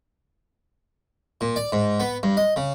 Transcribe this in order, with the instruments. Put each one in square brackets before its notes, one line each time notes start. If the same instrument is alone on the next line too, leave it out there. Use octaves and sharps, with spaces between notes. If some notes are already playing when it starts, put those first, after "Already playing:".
[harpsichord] A#2
D5
G#2
B3
G2
D#5
C#3